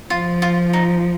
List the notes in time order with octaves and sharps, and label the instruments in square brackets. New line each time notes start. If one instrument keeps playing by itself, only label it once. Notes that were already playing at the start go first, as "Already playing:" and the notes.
[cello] F3 [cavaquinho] F4
[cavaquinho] F4
D#4